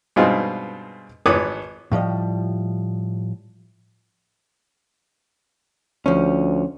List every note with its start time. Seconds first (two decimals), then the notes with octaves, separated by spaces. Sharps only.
0.16 G2 B2 G#3 C4 D#4 F4
1.26 G#1 G#2 B4 C#5 D6 D#6
1.92 A2 F3 G3 D#5
6.06 D2 F3 C#4